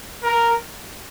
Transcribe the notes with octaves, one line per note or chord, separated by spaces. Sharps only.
A#4